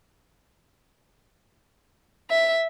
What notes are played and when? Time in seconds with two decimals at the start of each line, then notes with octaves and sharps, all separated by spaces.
2.31 E5